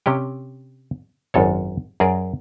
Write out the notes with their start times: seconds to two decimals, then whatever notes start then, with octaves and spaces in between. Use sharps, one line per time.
0.06 C3 C#4 G4 G5
1.34 G#1 F#2 A4 C#5
2.00 F#2 G#4 A#4 D5